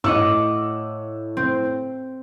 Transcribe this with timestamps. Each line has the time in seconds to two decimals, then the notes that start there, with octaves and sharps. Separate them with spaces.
0.04 A2 D#5 F#5 D6 E6
1.37 C4